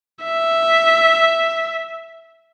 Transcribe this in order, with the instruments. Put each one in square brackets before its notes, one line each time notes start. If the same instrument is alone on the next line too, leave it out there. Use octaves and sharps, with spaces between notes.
[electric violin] E5